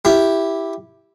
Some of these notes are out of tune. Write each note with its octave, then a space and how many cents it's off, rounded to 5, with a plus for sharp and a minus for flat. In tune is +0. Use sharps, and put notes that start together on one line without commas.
E4 +0 G4 +0